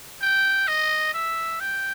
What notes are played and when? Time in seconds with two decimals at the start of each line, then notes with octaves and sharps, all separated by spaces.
0.22 G5
0.68 D#5
1.14 E5
1.60 G5